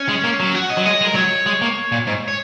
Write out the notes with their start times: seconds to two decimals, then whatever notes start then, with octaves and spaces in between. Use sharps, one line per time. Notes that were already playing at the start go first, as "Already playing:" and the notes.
Already playing: C#4
0.09 G#3
0.24 A#3
0.40 F#3
0.55 F#4
0.70 D#5
0.77 F#3
0.86 G#3 D#5
1.01 G#3
1.05 A#4
1.15 F#3 C#5
1.46 G#3
1.62 A#3
1.92 A#2
2.07 G#2
2.28 C#5